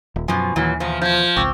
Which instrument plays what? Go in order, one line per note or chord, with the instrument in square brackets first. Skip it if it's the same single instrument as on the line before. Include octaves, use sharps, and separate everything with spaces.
[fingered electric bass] D#1
[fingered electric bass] F#2 [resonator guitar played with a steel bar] B2 F3 [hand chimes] G#5
[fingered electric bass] D#2 [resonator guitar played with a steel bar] A#2 E3 F#3
[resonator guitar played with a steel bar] E2 B2 [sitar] F3
[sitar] F3 [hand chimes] G6 G#6
[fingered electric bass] G#1 C#2 [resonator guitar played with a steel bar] C4 [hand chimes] C#6 D6 E6